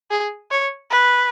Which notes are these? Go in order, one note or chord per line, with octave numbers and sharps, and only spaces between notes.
G#4
C#5
B4